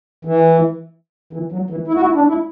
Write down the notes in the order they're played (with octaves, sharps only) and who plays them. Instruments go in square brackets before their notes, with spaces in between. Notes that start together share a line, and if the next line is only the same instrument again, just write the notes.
[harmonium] E3
E3
F#3
E3
E4
F#4
E4
D4
E4